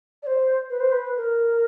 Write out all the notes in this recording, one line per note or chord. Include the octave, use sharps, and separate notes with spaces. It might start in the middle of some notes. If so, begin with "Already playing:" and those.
D5
C5
B4
C5
B4
A#4